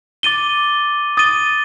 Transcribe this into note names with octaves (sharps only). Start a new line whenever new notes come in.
D6 A6 D#7 G7
D#6 A6 D#7 G7